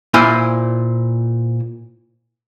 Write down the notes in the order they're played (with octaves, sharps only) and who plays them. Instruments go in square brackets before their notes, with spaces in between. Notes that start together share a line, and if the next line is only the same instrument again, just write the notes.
[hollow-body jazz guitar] A#2 E4 C5 G#5